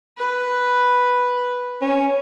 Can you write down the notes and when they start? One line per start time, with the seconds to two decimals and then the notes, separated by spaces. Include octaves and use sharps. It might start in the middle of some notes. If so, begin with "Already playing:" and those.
0.18 B4
1.82 C#4